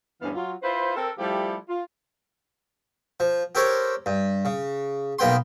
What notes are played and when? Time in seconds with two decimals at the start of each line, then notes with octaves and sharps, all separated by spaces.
0.22 D2 G2 E3 B3 C#4 F5
0.35 F#3 F4
0.62 E4 F4 B4 C5
0.96 C4 A4 A#4
1.18 F3 G3 A3 E4 F4 G4
1.69 F4
3.20 F3
3.55 G4 A4 A#4 C5 C#5
4.06 G2
4.45 C#3
5.19 B1 A#3 B3 G5 C6